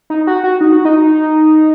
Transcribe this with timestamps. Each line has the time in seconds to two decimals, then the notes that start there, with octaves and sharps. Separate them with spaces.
0.10 D#4
0.27 F#4
0.44 F#4
0.61 D#4
0.72 F#4
0.85 D#4